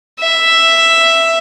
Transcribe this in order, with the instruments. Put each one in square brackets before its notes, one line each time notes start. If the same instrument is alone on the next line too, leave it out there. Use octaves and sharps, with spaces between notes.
[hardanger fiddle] E5